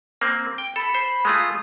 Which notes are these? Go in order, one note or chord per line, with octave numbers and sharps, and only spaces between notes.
A#3 C4
G5
A4 B5
C5
G#3 A3 F4 D#6